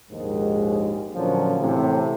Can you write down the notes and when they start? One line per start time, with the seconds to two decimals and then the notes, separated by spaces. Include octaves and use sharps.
0.11 A#1 D#2 G#2 D#3 G#3
1.15 A#2 D3 F3 F#3 A#3 C#4
1.60 A2 C3 E3